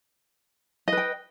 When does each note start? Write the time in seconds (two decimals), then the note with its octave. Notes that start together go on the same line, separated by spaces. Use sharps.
0.88 D#5
0.92 B4
0.97 G5